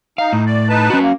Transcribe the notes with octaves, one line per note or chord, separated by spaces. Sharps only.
D#4 F5
A2
D5
D#4 B4 A5
C#4 F#4
A#3